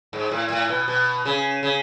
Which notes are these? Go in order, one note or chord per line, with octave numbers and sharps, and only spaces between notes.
G#2
A2
A2
B2
B2
C#3
C#3